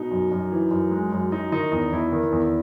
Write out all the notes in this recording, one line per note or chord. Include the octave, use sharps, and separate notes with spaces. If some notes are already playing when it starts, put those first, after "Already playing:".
Already playing: B2 D#4
F#2
F#2
E3
F#2
G#3
F#2
F#3 D#4
D#3 D#4
E2 D#4
E2 E4
D#3
E2